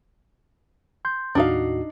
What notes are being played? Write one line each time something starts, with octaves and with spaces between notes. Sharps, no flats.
C6 G6
D#2 A2 D4 D#4 F#4 F5